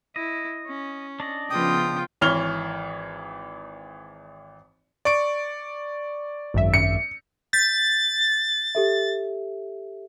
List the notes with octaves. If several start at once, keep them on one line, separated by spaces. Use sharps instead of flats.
E4 D#5
C#4
D4 D5 D#5
C#3 F3 B3 F4 G5 D#6
G#1 E3 C#5 F6 F7 G7
D5 C#6 D7
G#1 F#2 E5
C#7
G6 A6 B6
G4 A4 E5